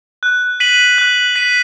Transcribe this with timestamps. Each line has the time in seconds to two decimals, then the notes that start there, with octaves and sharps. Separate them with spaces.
0.23 F#6
0.60 B6 D#7 F#7
0.98 F#6
1.36 B6 D#7 F#7